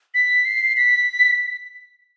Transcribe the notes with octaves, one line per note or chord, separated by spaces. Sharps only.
B6
C7
B6